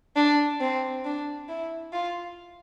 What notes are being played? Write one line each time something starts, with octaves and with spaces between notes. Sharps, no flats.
D4
C4
D4
E4
F4